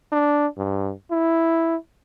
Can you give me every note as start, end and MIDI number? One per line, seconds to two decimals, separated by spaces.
0.12 0.47 62
0.58 0.92 43
1.11 1.76 64